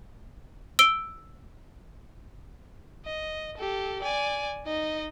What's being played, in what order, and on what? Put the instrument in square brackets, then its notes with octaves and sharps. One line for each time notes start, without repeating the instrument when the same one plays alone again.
[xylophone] E6 D7 G7
[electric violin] D#5
G4 A4
D5 G#5
D#4 D#5